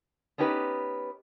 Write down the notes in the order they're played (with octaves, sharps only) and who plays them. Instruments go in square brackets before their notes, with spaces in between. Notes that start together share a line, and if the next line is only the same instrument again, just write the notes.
[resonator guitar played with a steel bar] B3 C#4 D#4 G4 B4